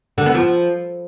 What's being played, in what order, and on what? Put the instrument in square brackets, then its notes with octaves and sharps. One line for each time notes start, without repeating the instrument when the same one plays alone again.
[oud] D3
B3
F3